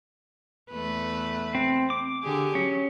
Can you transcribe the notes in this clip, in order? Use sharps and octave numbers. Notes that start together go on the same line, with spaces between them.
E2 A3 B4
C4
D6
D3 G4 G#4
F#3 C#4